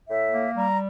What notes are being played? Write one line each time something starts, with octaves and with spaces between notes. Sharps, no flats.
A2 E5
A#3
G3 A#5